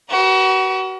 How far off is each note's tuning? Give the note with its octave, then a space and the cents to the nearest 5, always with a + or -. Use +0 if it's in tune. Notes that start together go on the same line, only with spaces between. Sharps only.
F#4 +30 B4 -45